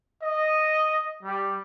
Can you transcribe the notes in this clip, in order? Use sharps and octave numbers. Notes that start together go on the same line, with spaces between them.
D#5
G3